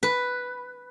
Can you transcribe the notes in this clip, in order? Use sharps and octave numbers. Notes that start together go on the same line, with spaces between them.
B4